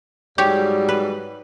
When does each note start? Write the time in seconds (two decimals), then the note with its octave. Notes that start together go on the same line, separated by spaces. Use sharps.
0.38 G#2 F#3 G3 G4 C#5
0.89 B4